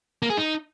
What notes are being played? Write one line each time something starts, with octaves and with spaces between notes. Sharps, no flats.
A#3
G#4
D#4